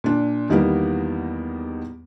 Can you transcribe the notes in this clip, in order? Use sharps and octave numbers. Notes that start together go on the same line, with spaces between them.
A#2 D4
E2 D#3 G3 A#3 B3